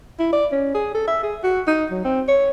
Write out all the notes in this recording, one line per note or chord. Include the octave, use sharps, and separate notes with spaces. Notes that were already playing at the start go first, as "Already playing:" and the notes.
E4
D5
C#4
G#4
A4
E5
G#4
F#4
D#4
F#3
C4
C#5